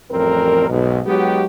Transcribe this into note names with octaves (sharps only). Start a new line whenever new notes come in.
A1 F2 E3 G3 C4 A#4
B1 G#2 B2
F#3 G#3 B3 D#4 F#4 G4